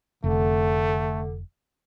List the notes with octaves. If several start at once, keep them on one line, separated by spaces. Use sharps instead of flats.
F1 D3 A3